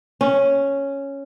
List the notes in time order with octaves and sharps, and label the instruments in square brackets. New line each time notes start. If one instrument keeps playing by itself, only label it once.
[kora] C#4